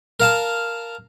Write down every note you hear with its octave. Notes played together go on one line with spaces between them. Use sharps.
A#4 F5 A5